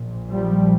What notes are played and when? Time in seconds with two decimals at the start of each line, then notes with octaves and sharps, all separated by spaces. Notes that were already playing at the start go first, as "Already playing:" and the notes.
Already playing: A#1 A#2
0.29 F3 G3